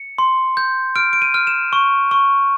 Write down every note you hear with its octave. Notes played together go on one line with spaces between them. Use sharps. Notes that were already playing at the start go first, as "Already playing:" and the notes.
Already playing: C#7
C6
G6
F6 D7
D7
D#7
F6
E7
C#6
C#6